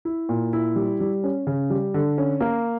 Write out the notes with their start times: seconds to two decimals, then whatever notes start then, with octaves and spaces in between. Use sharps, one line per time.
0.05 E4
0.29 A#2
0.53 E4
0.76 G3
1.00 G3
1.24 C#4
1.47 C#3
1.70 G3
1.94 D3
2.18 C#4
2.41 A#3